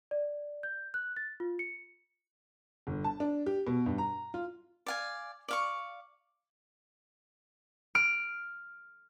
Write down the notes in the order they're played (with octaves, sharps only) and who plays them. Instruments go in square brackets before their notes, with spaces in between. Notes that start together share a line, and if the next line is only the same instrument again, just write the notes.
[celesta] D5
G6
F#6
A6
F4
C#7
[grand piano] G1
A5
D4
G4
B2
G2
A#5
F4
[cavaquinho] D5 F5 G#5
D5 F5 C#6
[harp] F6 D7